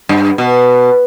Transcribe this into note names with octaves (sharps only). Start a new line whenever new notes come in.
G2
B2